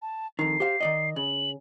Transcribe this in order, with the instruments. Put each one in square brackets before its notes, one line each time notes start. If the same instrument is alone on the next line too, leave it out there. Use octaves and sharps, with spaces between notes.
[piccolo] A5
[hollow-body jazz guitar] F2 D#3 [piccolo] C7
[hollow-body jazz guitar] G4 C5 F5
D#3 D5 D#5
[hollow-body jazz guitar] C#3 [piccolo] F#7